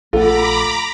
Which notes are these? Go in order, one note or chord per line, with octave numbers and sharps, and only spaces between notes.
A#1 A3 F4 A4 F#5 A#5 B5 D6